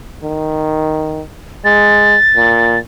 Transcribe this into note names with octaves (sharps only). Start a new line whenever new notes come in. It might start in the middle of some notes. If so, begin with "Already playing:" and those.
D#3
G#3 A6
A#2